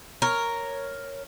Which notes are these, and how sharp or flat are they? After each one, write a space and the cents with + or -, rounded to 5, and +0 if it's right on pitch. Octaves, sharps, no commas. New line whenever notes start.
A#4 +0 C#5 +0